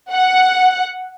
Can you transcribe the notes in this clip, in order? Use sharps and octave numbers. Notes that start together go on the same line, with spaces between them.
F#5